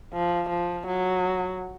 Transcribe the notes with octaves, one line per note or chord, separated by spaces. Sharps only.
F3
F3
F#3